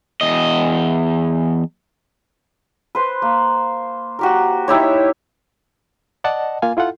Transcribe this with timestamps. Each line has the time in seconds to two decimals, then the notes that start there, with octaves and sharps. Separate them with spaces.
0.21 E2 D#5
2.95 B4 C5
3.22 A#3
4.19 F#4 G4 A#4
4.68 D#4 E4 G4 C#5
6.24 D5 D#5 F#5 A5
6.62 A#3 F4 F5 G#5
6.77 E4 F4 A4 F#5